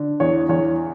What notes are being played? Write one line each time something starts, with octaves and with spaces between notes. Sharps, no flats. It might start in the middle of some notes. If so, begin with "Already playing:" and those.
Already playing: D3
E2 C#5
E2 C#5